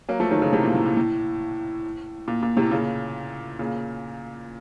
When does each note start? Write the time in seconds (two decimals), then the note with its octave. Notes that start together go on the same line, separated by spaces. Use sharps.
0.08 F#3 A#3
0.20 F3 A3
0.31 D#3 F#3
0.42 C#3 F3
0.53 A2 C3
0.63 A#2
0.75 A2
0.85 A#2
0.97 A2
2.28 A#2
2.43 A#2
2.57 A2 C3
2.71 A#2 C#3
3.59 A#2 C#3